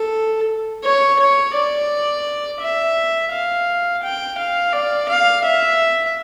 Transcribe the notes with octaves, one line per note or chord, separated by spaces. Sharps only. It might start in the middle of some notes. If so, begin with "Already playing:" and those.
Already playing: A4
C#5
C#5
D5
E5
F5
G5
F5
D5
F5
E5